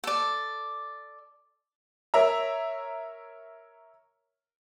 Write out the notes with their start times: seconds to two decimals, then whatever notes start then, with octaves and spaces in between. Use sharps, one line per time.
0.04 A4 D5
2.14 A#4 C#5 E5 A#5